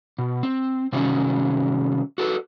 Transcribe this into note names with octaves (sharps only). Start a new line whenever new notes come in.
B2
C4
C3 D#3 F#3 G3 C#4
F#4 A4 B4